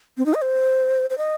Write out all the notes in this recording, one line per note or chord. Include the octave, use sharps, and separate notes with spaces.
C4
D#4
D#5
C5
C5
D#5